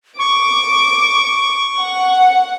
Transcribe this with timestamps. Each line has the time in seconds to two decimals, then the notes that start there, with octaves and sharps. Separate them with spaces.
0.19 C#6 D6
1.77 F#5